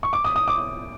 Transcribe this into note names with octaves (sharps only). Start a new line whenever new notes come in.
C#6
D6
D#6
D#6
D6